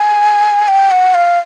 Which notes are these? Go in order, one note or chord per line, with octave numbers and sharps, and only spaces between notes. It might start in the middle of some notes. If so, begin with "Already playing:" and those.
Already playing: G#5
G5
F#5
F5